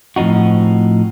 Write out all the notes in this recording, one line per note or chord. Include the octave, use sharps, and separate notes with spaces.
A2 F3 C4 D#4 F#4